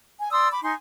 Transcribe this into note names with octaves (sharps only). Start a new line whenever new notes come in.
G#5
D5 C6 D#6 E6
B5 D6
D#4 G#5 C6